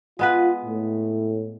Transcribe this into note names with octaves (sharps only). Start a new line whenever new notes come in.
G#3 B3 F4 B4
A2